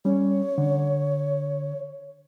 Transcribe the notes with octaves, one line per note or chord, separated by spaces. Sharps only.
G3 C#4 C#5
D3